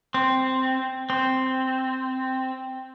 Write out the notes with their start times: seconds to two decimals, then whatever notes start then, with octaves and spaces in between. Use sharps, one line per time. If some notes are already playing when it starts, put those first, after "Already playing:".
0.14 C4
1.10 C4